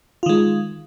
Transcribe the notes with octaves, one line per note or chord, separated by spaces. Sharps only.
D#3 G#3 F4